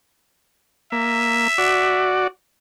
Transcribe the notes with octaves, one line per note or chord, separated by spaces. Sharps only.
A#3 E5
F#4 D5